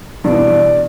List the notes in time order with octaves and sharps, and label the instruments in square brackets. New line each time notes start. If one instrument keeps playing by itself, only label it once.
[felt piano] G2 B2 E3 [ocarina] D5